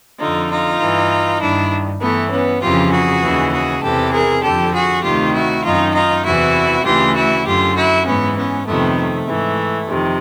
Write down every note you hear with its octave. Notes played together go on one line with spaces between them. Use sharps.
F2 D3 D#4 F4
D#4 F4
G2 E3
G2 D#3 D4 E4
G2 E3 A3 B3
B3 C#4
F2 C#3 E3 F4 G4
F#4 G#4
D#2 C#3 E3
F#4 G#4
E2 C3 E3 G4 A4
G#4 A#4
F2 D3 G4 A4
F#4 G#4
D2 C3 D#3 F4 G4
E4 F#4
F#2 D#3 D#4 F4
D#4 F4
E2 C3 E3 E4 F#4
D2 C#3 E3 F4 G4
E4 F#4
F#2 D3 F4 G4
E4 F#4
G#2 E3 B3 C#4
B3 C#4
F2 C3 D#3 A3 B3
A3
G#2 E3
F2 C3 D#3